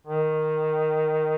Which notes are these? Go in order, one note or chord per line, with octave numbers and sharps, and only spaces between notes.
D#3